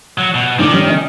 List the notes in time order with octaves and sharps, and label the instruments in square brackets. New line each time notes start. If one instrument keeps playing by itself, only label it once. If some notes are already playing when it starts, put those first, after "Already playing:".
[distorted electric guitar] F#3
B2
[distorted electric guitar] D#3 [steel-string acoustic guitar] D4 D#4 D5
[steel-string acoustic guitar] G3 C#4
C#4 D#5